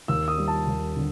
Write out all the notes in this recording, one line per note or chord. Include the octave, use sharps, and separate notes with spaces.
D#2 E6
D#6
G3
A5
D#2
D3